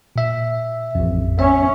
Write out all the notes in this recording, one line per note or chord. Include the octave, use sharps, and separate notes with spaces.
A#2 E5
A1 F2
C#4 E5